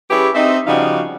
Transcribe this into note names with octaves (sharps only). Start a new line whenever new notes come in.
G3 C#4 E4 G4 G#4 B4
C4 D#4 E5
C#3 F3 G3 D#4 F#4 F5